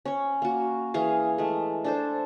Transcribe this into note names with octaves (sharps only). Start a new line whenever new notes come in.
C#4 C#5
A#3 F#4
E3 G#4 F5
G#3 A3
D4 A4 C5